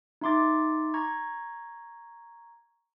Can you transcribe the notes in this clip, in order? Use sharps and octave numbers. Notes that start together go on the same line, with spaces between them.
D#4 E5 C6 D6 A6
A#5 C#6 G#6